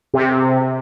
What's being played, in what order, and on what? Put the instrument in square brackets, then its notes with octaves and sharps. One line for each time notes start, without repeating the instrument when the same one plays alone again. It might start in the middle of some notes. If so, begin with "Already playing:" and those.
[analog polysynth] C3